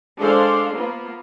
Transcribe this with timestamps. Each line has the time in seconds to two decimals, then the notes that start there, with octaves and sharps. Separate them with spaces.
0.18 G#3 D4 A4 C5 F5
0.75 A#3 B3 F4